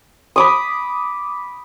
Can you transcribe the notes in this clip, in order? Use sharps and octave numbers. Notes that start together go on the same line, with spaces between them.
B5 D6 D#6